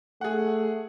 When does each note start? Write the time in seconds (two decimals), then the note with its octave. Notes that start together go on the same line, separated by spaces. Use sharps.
0.21 A3 G#4 F#5